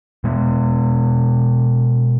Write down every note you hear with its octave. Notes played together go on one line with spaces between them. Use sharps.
B2 G#3 B3